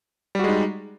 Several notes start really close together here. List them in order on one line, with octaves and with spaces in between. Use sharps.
G3 F#4 G#3 D#4